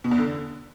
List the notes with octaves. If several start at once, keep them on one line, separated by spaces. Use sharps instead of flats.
B2
E2
D3